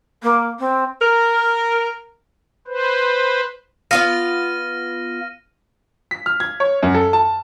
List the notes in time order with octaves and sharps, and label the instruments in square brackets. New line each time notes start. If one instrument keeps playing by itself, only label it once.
[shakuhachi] A#3
C4
[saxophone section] A#4
[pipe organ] B4 C5
[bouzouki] B3 F4 F5 [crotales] F6 A#6 D#7
[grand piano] B6
F6
G#6
C#5
F#2
A4
A5